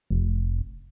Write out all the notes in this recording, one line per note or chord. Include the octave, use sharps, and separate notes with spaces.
F1